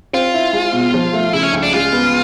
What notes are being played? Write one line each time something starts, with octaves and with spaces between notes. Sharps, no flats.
C4 F4
E4
G#3
B2
F3
A3
C#3 E4
C#4
C#2
D4
G#3 F4
B3